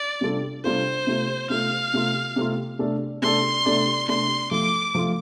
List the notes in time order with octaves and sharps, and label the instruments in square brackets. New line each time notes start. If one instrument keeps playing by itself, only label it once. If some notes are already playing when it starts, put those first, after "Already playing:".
Already playing: [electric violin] D5
[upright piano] C3 G3 D4 F4 A4
[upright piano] C3 G3 D4 F4 A4 [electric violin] C5
[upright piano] C3 A3 F4
[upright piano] C3 A3 F4 [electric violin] F5
[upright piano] C3 A3 F4
C3 A3 F4
C3 A3 D4 A4 D5
[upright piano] C3 A3 D4 A4 D5 [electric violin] C6
[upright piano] C3 A3 D4 A4 D5
[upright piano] C3 A3 D4 A4 D5 [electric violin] C6
[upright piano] F3 A3 F4 [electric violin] D6
[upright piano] F3 A3 F4